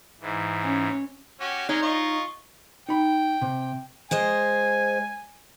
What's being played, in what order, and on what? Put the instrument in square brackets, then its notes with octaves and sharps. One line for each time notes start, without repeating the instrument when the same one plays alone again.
[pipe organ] G#2 E3
[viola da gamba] C#4
[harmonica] C#4 F#4 G4
[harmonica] G#3 C#4 D#5 [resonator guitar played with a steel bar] D#4 C#5
[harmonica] F4 D#5 C#6
[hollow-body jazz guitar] D#4 B5 [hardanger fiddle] G5
[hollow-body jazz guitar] C3
[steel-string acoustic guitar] G#3 C5 D#5 [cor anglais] G#5